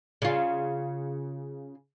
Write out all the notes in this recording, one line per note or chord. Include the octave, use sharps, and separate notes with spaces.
C#3 F4